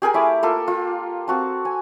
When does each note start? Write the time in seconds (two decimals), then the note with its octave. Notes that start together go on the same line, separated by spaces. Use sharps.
0.02 G4 G#4 A#4 G#5
0.14 A3 E4 E5 D6
0.43 A#3 F4 A4
0.68 F4
1.28 C4 F#4 A5
1.65 G#5